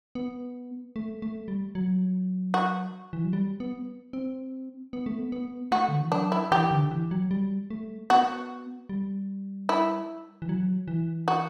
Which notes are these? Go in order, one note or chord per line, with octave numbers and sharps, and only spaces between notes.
B3
A3
A3
G3
F#3
F#4
E3
F#3
G3
B3
C4
B3
A3
B3
B3
A3 F#4
D3
E3
F#3 D4
E4
E3 G4
D3
E3
F#3
G3
A3
B3 F#4
G3
E4
E3
F#3
E3
F#4